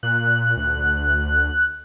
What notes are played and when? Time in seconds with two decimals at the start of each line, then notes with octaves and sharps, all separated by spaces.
0.03 A#2 F#6
0.57 D2